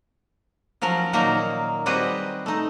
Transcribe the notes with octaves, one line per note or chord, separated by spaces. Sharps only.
F3 F#3 C#4 A#4
A#2 D#3 F#3 A#3 D#4 A#4
G3 C4 F#4 G#4 B4 D#5
A3 D#4